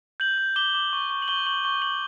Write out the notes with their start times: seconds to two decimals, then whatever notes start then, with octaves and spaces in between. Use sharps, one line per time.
0.20 G6 F#7
0.38 G6
0.56 D6 G7
0.74 D6
0.93 C#6
1.10 C#6
1.22 F#7
1.28 C#6 G7
1.46 C#6 F#7
1.64 C#6 G7
1.82 C#6 F#7